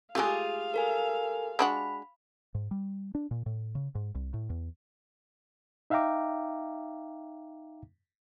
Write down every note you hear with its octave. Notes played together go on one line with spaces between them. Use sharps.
G#3 A3 F4 G4 G#4 F5
A4 A#4 G#5
G#3 D4 F#4 B5
G#2
G3
D4
A#2
A2
C#3
G#2
C2
A2
E2
D#4 E5 F5 G5 A#5 D6